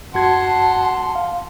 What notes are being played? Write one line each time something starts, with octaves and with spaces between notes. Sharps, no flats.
F#2 F#4 F#5 A5 C6 G#6
F5